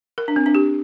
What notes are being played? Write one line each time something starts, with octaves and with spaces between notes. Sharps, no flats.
A#4
D4
C4
D4
G4